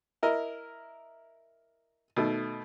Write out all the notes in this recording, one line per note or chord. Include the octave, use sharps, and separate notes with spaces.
E4 A#4 D#5
B2 D#3 A3